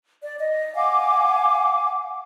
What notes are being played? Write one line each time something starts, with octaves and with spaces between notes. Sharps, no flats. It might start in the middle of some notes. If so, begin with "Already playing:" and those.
D5
D#5
F5 F#5 G#5 D6